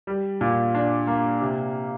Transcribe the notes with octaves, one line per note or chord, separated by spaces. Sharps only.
G3
A#2
D4
A#3
C3